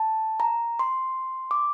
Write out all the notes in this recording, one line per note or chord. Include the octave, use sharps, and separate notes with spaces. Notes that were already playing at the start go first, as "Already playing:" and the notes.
Already playing: A5
A#5
C6
D6